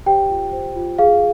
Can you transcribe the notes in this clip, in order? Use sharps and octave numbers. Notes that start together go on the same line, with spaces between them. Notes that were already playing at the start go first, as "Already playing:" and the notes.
G4 C5 G5
F4
C5
F4
G#4 F5